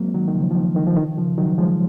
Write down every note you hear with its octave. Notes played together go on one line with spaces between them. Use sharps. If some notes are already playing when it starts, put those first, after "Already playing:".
Already playing: F#3 G#3 A#3 C4
D#3 F#3
D#3
C#3 F3
F3
D#3
D#3
F3
D#3
C#3 F3
D#3 F#3
F3 G#3